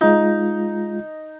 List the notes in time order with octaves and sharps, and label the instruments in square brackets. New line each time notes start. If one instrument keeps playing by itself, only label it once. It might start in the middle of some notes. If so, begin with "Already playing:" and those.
[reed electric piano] G#3 F4 [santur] D#4